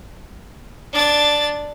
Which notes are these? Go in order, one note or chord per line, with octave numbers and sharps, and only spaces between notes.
D4 A6